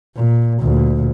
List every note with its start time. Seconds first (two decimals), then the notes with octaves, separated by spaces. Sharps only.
0.16 A#2
0.61 D2 A#2